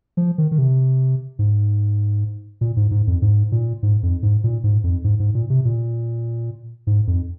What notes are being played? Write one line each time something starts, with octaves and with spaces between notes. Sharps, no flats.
F3
D#3
D#3
C3
G#2
A#2
G#2
G#2
F2
G#2
A#2
G#2
F2
G#2
A#2
G#2
F2
G#2
G#2
A#2
C3
A#2
G#2
F2